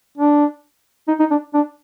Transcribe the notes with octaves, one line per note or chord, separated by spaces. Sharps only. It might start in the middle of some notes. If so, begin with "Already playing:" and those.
D4
D#4
D#4
D4
D4